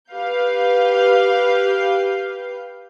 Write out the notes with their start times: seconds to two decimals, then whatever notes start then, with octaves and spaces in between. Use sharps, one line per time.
0.11 G4 B4 F5 G6